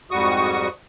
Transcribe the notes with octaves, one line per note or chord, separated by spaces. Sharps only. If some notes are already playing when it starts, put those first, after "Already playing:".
F2 G#2 G3 F#4 C#6 D#6